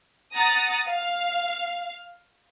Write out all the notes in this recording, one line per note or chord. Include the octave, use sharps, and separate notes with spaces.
F#5 A#5 D#6 A6
F5